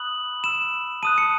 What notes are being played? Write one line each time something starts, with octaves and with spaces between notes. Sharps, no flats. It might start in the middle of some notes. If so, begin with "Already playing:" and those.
Already playing: B5 D#6 F#6 F#7
B5 E6 E7
A5 D#6 F#6 D#7
C#7